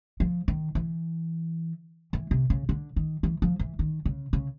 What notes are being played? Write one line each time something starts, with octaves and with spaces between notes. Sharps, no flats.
F3
D#3
E3
E3
C3
C#3
D3
D#3
E3
F3
E3
D#3
C#3
C#3